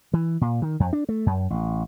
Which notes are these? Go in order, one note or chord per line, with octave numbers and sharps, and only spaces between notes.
E3
A#2
D#3
F2
D4
A3
F#2
A1